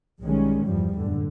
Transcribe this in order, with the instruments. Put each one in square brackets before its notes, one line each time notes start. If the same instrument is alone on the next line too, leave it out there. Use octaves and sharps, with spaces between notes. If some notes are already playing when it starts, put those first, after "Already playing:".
[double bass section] B1 D#3 G3 G#3 C#4
G1 E2 G2 F3 G3
F#1 A2 D3